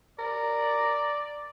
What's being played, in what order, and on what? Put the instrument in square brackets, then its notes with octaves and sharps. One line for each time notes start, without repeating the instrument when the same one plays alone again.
[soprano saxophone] A#4 [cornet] D5